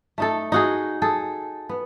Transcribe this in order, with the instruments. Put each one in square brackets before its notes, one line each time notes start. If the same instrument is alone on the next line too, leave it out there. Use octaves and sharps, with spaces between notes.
[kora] A3 D#4 A4
D#4 F#4 G#4
G#4 A4
B3